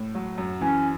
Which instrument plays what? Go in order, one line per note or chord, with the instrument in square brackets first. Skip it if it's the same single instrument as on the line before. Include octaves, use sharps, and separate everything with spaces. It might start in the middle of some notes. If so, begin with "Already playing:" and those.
Already playing: [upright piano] A2
F#3
F#2
[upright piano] E3 [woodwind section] C#4